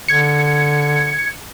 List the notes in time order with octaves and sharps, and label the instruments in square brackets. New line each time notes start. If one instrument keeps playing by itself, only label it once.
[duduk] D3 [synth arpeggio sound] G#6 C#7